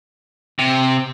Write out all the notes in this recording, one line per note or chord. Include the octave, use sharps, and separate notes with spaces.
C3